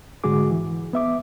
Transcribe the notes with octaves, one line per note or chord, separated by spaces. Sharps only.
G#2 D3 G#3 F#4 G#4 D6
E3
B3 E5 D6